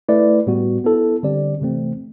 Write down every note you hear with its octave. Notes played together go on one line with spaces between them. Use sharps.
A3 E4 B4 D5
A2 G3 B3 F#4
B3 E4 A4
D3 G3 C4 G4 D5
C3 E3 A3 C4